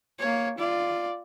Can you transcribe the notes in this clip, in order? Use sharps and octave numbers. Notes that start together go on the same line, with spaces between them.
A#3 C#5
F4 D5